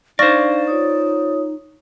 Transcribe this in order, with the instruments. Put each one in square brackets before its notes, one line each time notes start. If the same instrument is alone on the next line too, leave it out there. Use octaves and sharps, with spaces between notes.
[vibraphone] D4 F5 [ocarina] D#4 [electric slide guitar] C5 D5 [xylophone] C#6 F6 A#6
[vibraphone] F4 C#5 D#6